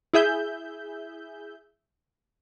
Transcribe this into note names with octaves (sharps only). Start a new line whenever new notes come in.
E4 G#4 E5 G6